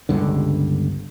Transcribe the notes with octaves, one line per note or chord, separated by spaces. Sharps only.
G1 C#2 G2 D3